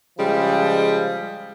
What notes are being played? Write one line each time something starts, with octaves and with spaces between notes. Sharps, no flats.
C#3 F3 G3 G#3